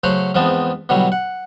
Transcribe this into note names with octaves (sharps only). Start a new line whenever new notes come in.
C#3 F#3 A3 C5 C#5 F#5
E2 G#2 F3 B3 C4 A5
B2 D3 F#3 G3 E4
F#5